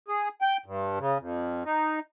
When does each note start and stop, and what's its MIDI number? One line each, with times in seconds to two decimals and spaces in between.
0.08 0.29 68
0.42 0.57 79
0.66 0.99 43
0.99 1.18 49
1.19 1.64 41
1.65 2.00 63